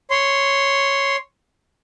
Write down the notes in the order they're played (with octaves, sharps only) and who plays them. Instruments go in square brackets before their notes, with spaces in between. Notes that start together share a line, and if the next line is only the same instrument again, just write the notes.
[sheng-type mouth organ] C#5 C6